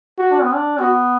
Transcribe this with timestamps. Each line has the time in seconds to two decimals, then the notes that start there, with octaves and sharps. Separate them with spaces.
0.18 F#4
0.31 D4
0.42 B3
0.54 D4
0.80 B3 F#4